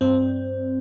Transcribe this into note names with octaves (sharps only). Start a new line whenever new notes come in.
G2 C4